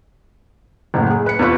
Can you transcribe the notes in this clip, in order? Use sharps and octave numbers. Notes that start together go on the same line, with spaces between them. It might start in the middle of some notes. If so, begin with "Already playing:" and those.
F#1 A2 F#5
G#4
B4 C#7
E2 C3 F4 B4 C#6